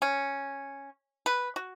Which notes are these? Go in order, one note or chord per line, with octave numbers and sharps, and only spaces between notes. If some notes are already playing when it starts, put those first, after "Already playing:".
C#4
B4
F#4